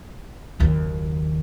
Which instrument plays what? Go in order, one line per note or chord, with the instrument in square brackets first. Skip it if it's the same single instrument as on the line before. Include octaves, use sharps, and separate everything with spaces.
[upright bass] F#1 D#2